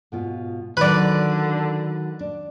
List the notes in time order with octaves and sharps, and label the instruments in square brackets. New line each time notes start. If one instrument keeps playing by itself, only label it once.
[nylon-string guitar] G#2 B2 F4
[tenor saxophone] D3 [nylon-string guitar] D#3 F#3 [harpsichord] B4 D5
[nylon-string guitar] D4